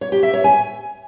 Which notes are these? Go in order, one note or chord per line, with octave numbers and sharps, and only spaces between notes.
C#5
G4
E5
C#5
G#5